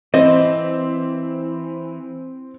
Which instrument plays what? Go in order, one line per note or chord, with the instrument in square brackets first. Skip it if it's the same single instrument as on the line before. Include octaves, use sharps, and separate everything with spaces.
[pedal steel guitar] E3 [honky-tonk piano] C4 [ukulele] D#5